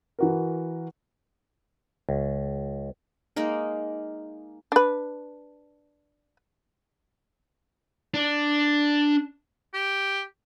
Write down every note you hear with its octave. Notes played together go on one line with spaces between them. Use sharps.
E3 F#4 A#4
C#2
G#3 A#3 D#4 A#4
D4 B4
D4
G4